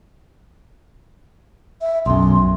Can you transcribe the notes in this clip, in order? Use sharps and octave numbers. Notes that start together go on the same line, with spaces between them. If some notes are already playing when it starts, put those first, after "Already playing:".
E5
B1 F#2 C6